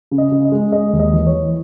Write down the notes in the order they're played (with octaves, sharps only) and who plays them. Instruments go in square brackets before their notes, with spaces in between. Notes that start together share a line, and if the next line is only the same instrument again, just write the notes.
[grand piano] C#3
D#5
C#3
D#5
G#3
G#3 D#5
D#2
D#5
E3
C#5
E3